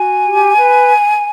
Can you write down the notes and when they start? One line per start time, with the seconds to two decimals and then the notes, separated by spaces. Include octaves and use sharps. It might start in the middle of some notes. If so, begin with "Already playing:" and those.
Already playing: F#4 G#5
0.24 G4
0.56 B4